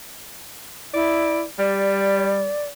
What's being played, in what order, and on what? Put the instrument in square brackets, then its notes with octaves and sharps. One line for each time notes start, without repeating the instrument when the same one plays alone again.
[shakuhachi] E4 [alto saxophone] D5
[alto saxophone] G3 [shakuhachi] D5